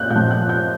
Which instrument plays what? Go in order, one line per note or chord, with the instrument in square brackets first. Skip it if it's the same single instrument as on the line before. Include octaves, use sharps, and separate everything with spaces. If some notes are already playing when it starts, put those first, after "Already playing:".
Already playing: [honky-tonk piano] A#2 F#6 G6
A#2 G6
F3
F#6
G6